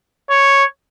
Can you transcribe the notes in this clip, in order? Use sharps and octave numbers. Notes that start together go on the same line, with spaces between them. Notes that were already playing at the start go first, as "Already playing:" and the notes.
C#5